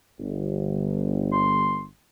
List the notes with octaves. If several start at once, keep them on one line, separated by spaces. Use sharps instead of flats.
G1
C6